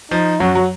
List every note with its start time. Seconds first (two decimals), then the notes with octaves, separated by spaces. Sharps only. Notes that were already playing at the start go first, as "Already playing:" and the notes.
0.11 F3 D#4
0.40 F#2 F#3 F#4
0.55 F#3